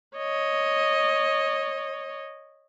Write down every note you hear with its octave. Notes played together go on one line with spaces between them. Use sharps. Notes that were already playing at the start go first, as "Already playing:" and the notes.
C#5 D#5